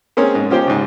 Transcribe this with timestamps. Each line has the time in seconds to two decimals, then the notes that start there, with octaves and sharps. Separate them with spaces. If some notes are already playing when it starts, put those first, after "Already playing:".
0.17 A#3 C4 C#4 G#4 C#5
0.35 G#2
0.50 F3 C#4 G4 C5 G5
0.67 C#2 G#2